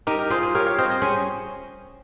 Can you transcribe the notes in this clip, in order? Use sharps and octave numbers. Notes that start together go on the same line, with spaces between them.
D#4 G4 A#4
G4 A#4
F4 G#4 C5
G#4 C5
G4 A#4 C#5
C#5 F5
C4 C5 D#5
C5 D#5
C#4 G#4 C5